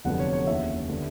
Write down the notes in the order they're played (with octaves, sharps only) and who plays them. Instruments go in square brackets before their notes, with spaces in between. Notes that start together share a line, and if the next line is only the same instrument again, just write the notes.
[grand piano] F1 F2 D3 F#3 B3 F#5
C#5
C#5
D#2 C#3 E3 E5
D3 G3 B3